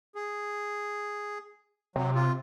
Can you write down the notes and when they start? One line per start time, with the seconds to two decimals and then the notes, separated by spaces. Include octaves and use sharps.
0.15 G#4
1.96 C3 F#3
2.14 F4